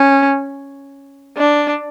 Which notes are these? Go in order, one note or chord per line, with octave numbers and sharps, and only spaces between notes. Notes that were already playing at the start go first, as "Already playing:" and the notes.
Already playing: C#4
D4